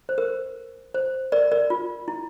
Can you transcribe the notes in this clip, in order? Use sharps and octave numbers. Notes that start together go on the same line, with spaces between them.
C5
A#4
C5
A#4 D5
A#4 D5
F4
E4